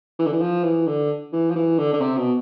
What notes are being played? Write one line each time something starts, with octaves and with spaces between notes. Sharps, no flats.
E3
D3
E3
F3
E3
D3
E3
F3
E3
D3
D3
C3
B2